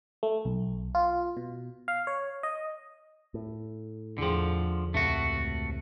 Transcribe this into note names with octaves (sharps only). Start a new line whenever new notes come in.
A3
B1
F4
B2
F5
C#5
D#5
A2
E2 D3 F3 G#4 G5
C#2 A2 C3 A3 F#4